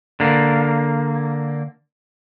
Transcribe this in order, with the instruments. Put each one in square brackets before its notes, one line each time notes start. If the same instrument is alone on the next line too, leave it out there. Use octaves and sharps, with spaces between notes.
[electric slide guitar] D3 A#3